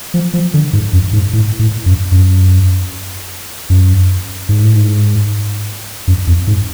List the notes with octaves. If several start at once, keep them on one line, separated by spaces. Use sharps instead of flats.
F3
F3
D3
G#2
F#2
G#2
A2
A2
F#2
F#2
F#2
G#2
A2
G#2
F#2
F2
G#2